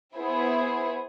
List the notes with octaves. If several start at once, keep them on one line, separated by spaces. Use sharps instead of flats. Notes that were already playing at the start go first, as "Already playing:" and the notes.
B3 E4 G#4 C5